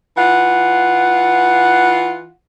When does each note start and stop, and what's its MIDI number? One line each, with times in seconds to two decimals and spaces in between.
0.17 2.29 52
0.17 2.29 65
0.17 2.29 78